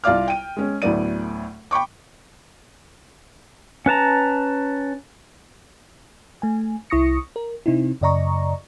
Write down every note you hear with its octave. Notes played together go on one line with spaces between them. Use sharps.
C2 F4 D5 F5 D6 F6
G5 D#7
G#3 C#4
D2 A2 F#3 B3 D5 D#7
G5 B5 C#6 D6
C#4 B4 A5 A#5
A3 G#5
C2 E4 C#6 D#6 A#6 C#7
A#4
C3 C4 D#4 E4
F#2 C#3 D5 D#5 A#5 C#6